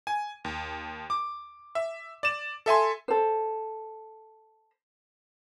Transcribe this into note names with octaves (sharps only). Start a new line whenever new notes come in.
G#5
D#2
D6
E5
D5 E7
A4 E5 G#5 C6
A4 C5